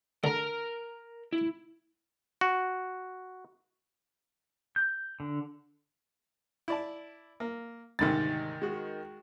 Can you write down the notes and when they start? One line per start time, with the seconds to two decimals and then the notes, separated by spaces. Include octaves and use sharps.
0.24 D3 A#4 A#5
1.33 E4
2.41 F#4
4.76 G6
5.20 D3
6.68 E4 D5 A5
7.40 A#3
7.99 D2 G#2 C3 D#3 A6
8.62 G#3 F#4